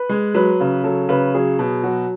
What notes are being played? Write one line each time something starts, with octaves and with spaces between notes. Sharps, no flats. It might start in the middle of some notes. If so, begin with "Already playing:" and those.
Already playing: B4
G#3
F#3 B4
C#3
F#3 A4
C#3 B4
F#3 G#4
B2
F#3 F#4